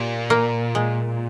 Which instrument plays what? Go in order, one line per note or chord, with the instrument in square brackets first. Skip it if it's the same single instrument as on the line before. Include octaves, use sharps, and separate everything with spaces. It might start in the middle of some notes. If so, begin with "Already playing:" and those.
Already playing: [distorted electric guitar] A#2 [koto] G4
[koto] A#3
G#3